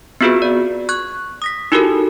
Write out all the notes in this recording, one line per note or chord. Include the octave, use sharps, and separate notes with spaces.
B3 C4 F4 F#4 G#4 B4
D5
C#6 F#6 G#6
D#6 A#6 B6
D#4 E4 F#4 G4 A4 A#4